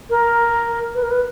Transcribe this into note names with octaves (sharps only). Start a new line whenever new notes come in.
A#4
B4
A#4
B4